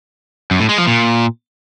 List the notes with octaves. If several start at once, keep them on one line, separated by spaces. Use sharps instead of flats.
F#2
A2
G#3
F3
A#2